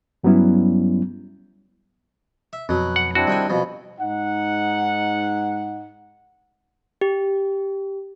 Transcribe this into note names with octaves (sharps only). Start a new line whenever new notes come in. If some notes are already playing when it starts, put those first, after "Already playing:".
G2 F#3 G3 B3 C#4 E4
E5
F2 B2 F#3 F#6
F#5
C4 D4 E4 F#4
D#3 G3 G5 G#5
F2 B2
G#2 D#4 F#5
G4